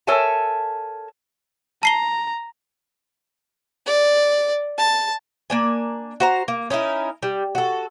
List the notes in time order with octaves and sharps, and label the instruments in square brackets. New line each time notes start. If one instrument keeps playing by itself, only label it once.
[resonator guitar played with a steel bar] A4 A#4 C#5 E5 G#5 A5
[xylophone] A5 C7 G7 [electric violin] A#5
[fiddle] D5
A5
[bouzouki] A#3 D4 G#5
F#4 C5 A#5
A#3
C#4 D#4 E4 A#4
G3
F#4 A4